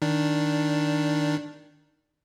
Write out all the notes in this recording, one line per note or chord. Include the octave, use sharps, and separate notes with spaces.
D#3 D4